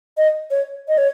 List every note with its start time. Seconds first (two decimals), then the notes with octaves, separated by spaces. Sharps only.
0.17 D#5
0.51 C#5
0.88 D#5
0.98 C#5